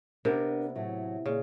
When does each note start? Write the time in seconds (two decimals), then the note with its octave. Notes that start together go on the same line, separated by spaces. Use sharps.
0.25 C3 B3 D4 G4 A#4
0.75 A2 F#3 A3
1.25 A#2 C#3